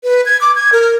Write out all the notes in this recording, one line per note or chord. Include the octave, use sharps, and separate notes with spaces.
B4
G#6
D6
G#6
A#4